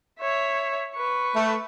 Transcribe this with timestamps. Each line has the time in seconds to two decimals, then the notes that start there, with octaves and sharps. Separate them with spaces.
0.20 C#5 E5
0.95 B4 C#6
1.36 A3